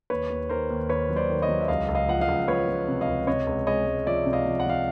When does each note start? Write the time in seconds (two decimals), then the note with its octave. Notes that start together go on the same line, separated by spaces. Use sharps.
0.10 D#2 B4 C#5
0.30 D#2
0.49 D#3 A#4 C5
0.70 D#2
0.89 D#2 B4 C#5
1.09 F#3
1.16 C5 D5
1.30 D#3
1.42 C#5 D#5
1.49 F#3
1.61 E5
1.68 C#2 D#5 F5
1.88 C#2
1.95 D#5 F5
2.08 F3 F#5
2.21 D#5 F5
2.28 C#2
2.48 F3 B4 C#5
2.68 F3
2.88 C3
3.01 D#5 F5
3.08 C#2
3.27 C3 C#5 D#5
3.47 C#2
3.67 G#3 C#5 D#5
3.86 G#3
4.06 F3 D5 E5
4.26 C3
4.33 D#5 F5
4.46 F3
4.60 F#5
4.66 F3 F5